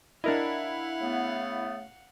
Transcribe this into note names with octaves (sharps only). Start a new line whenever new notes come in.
D4 E4 A#4 D#5 F5 F#5
C#3 A3 B3